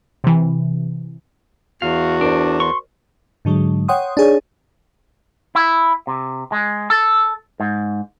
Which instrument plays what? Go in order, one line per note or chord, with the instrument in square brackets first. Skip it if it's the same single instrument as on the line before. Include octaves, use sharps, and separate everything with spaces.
[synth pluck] C3 E3
[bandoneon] E2 [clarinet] F#4 [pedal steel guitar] F5
[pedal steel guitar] D4 [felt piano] A#4 C5 D5
[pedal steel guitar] C6 C#6
[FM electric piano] G#2 D3 F#3 G#3
C#5 F#5 G5 C6 D#6
D4 D#4 G#4 C#5
[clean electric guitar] E4
C3
G#3
A4
G#2